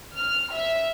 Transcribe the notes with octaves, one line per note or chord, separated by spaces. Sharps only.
F6
E5